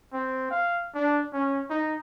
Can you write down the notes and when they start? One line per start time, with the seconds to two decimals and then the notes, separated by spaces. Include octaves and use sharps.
0.13 C4
0.51 F5
0.95 D4
1.33 C#4
1.70 D#4